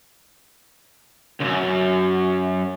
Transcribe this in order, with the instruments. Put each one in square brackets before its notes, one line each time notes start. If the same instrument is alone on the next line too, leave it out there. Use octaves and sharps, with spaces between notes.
[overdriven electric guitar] C#2 F#2